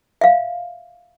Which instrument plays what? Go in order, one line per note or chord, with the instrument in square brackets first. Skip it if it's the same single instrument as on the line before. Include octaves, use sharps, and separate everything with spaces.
[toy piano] E5 F5